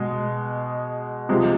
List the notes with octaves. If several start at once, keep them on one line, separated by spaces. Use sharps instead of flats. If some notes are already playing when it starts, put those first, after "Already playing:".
Already playing: B2 G#3
C3 F3 G#3